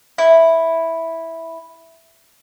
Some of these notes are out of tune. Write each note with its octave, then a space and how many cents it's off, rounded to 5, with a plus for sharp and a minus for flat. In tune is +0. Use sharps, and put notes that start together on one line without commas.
E4 -5